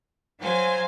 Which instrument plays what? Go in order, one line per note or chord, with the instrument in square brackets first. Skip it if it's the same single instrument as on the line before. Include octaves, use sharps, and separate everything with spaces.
[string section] F#3 G#5 [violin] C5 F5